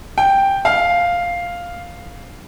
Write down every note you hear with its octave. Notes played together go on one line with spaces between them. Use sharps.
G5
F5